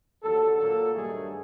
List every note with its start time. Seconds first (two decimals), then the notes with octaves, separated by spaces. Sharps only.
0.21 D#2 D3 F#3 A4
0.57 A#2 F#3 A#3 A4
0.93 G2 D#3 F#3 A3 G#4